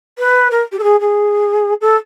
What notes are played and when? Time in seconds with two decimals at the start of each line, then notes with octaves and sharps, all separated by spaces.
0.18 B4
0.51 A#4
0.72 G4
0.79 A4
0.83 G#4
1.00 G#4
1.81 A4